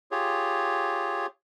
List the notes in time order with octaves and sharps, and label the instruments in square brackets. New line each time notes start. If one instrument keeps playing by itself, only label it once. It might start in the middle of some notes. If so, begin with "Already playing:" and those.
[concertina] F4 G4 G#4 C#5